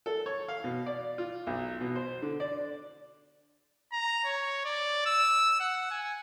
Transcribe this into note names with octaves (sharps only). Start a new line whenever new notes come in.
A4
C#5
F5
B2
D5
F4
B1
B2
C5
D3
D5
A#5
C#5
D5
E6
F#5
G#5